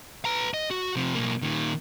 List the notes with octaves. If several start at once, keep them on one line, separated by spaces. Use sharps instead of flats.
B4 A#5
D#5
F#4
C3 F3
B1 A#3
A#2 D#3